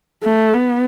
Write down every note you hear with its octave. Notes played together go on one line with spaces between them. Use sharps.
A3
B3